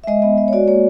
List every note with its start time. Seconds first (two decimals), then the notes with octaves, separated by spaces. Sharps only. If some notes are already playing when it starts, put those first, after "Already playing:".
0.04 E5
0.07 G#3 D#5
0.22 B3 D#5
0.38 G#3 D#5
0.48 C#5
0.53 F#4 D5
0.68 A#3 C#5